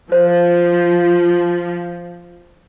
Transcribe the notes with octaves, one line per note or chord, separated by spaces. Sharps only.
F3 C5